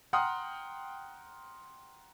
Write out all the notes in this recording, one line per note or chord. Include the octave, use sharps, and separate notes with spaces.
F#5 G5 A#5 C6 D#6 F6